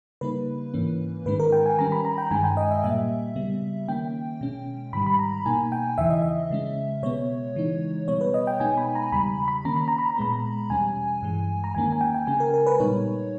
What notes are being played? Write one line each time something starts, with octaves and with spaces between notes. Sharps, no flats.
C#3 G3 A#3 D#4 B4
G#2 E3 A#3 C#4
G#2 D#3 G#3 C#4 B4
A#4
G5
G#5
D#3 G3 C#4 A#5
B5
A#5
G5
A#5
G2 D#3 G#3 C#4 G#5
G5
D#5
E5
A#2 G3 A#3 E5
C#3 G3 B3
D#3 A#3 C#4 G5
B2 G#3 C#4
G#2 D#3 G3 B5
B5
A#5
B2 A#3 D#4 G#5
G5
E2 C#3 E3 E5
D#5
E5
C#3 G#3 C#4
B2 G#3 B3 C#5
C#3 E3 G#3 D#4
B2 G3 B3 C#5
B4
D#5
G5
B2 G#3 B3 D#4 G#5
B5
A#5
E2 C#3 G3 B5
B5
D#3 A#3 C#4 A#5
B5
A#5
B5
A#5
A#2 G#3 B3 B5
A#5
E2 B2 G3 C#4 G#5
G2 E3 G#3
A#5
E2 D#3 A#3 C#4 G#5
G#5
G5
G5
C#3 G#3 C#4 G#5
A#4
A#4
B4
A#2 G3 B3 D#4 C#5